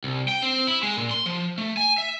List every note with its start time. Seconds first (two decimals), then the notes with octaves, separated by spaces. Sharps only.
0.04 C2
0.28 G5
0.42 C4
0.68 E4
0.83 G#3
0.97 A#2
1.11 C6
1.26 F3
1.58 A3
1.77 G#5
1.98 E5